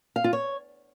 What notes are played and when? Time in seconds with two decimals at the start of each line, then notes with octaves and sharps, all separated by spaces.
0.16 F5
0.24 F4
0.33 C#5